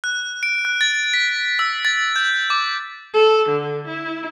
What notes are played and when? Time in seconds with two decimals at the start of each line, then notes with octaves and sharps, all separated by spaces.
0.04 F#6
0.43 D7
0.65 F#6
0.81 A6
1.14 B6
1.59 E6
1.85 A6
2.16 G6
2.50 D6
3.14 A4
3.49 D3
3.87 E4